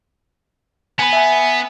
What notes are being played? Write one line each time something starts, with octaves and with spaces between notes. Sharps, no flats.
B3 G#5 B5
E5 G#5